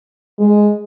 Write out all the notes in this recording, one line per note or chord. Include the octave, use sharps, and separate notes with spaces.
G#3